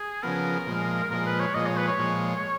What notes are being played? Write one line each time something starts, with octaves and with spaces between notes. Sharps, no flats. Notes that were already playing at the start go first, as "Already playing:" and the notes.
Already playing: G#4
C#3 F3 B3 A#4
A#2 F3 G#3
A#2 F3 G#3 A#4
B4
C#5
A#2 F3 G#3 D#5
C#5
B4
C#5
A#2 F3 G#3